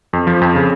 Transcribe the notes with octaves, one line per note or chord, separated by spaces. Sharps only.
F2
F3
F2
C#3